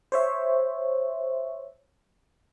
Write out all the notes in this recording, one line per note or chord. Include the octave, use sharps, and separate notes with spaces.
C5 C#5 E5